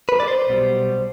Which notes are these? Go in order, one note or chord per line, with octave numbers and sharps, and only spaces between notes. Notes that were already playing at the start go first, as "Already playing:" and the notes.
B4
D5
C5
B1 B2 G3